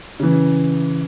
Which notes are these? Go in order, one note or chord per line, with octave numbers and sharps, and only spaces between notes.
C#3 E3